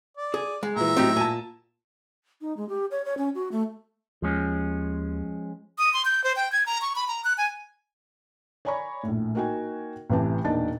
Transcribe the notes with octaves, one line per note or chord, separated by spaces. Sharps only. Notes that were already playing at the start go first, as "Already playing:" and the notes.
D5
G#4
G#3
A#2 E3 E5 A#5
A2 F#3 C4 D#4 G4
A#2 G#5 A5
D#4
G#3
G4
C#5
C#5
C#4
F#4
A3
D#2 F3 G#3 C#4
D#6
C6
G6
C5
G5
G#6
A#5
C#6
B5
A#5
F#6
G#5
C#5 D5 G#5 A#5 B5 C#6
A#1 A2
A#3 D#4 F#4 G5 G#5
A1 C3 E3 G4 A5
E1 A#2 D4 D#4 A5 A6